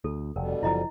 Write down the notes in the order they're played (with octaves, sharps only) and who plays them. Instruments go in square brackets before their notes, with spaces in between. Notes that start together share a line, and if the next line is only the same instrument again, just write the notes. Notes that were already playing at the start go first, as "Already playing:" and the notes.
[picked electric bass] D2 [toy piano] A4
[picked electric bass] F1 [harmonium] B2 D3 G3 [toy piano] A#4
[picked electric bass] F#1 F3 [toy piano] E4 D#5 A#5